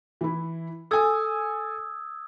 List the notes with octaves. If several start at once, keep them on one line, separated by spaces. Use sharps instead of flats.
E3 E4
A4 G#5 D#6 E6 G#6